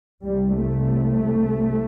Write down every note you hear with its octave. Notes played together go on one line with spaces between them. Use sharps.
C2 C3 G3
A3